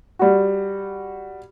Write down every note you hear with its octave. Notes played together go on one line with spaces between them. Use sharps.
G3 F#4